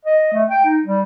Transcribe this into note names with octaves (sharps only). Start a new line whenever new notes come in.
D#5
A3
G5
D#4
G3